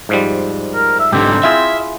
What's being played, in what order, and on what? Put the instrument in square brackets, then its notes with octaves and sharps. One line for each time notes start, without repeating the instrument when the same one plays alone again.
[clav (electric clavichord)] G#2 F3 G3
[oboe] A#4
E5
[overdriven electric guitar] G#2 D3 [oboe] C4 [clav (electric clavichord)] G4
[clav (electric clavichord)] E4 F4 G#4 [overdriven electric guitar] E5